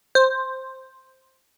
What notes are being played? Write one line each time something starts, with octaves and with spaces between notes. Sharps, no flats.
C5